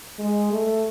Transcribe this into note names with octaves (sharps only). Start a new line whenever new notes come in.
G#3
A3